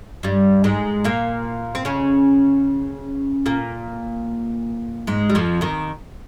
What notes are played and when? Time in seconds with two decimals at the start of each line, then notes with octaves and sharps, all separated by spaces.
0.23 G2 G3
0.64 G#2 G#3
1.04 A#2 A#3
1.75 C4
1.85 C#3 C#4
3.46 A#2 A#3
5.07 G#2 G#3
5.30 G3
5.35 F2 F3
5.61 D#2 D#3